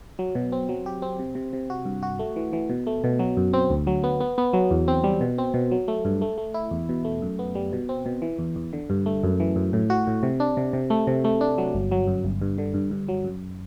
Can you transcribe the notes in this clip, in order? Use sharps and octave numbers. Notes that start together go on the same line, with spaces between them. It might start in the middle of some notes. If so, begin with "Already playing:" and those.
F#3
B2
C4
F#3
G4
C4
C3
C3
C3
F#4
G2
F#4
A3
E3
E3
B2
A3
B2
F#3
F#2
C4
D2
F#3
B3
B3
B3
F#3
E2
C4
G3
B2
C4
B2
F#3
A3
G2
A3
A3
E4
E2
B2
A3
F#2
B3
G3
B2
C4
B2
E3
E2
E2
D3
G2
A3
F#2
E3
F#2
A2
F#4
A2
C3
D4
C3
C3
A3
C3
A3
D4
F#3
G1
F#3
F#2
G1
G2
D3
G2
G2
F#3
F#2